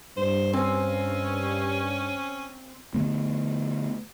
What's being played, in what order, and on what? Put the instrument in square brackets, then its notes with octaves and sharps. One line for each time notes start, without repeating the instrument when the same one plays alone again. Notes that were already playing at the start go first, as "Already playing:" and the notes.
[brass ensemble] G2 [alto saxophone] C5
[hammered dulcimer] C4 G#5 [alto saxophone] C#4
[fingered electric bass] D3 A3 B3